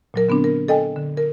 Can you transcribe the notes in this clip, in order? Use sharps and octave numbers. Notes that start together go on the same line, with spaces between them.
A#2 F#3 A#4
D3 B3 C4 D4
A#4
A4 D#5 G5 G#5
D3
A#4